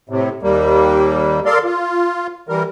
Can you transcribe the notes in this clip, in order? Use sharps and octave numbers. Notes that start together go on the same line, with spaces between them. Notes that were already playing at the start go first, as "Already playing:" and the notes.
A2 C3
D#2 G3 A#3
A4 A#4 D5 F5 C6
F4
E3 G3 A#4